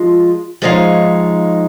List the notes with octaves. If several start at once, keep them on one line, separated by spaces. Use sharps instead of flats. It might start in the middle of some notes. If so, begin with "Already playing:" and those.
Already playing: F3 G#3 F4
F3 G#3 D#4 C#5 F5